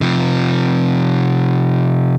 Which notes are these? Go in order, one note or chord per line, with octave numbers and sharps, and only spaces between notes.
C3 F3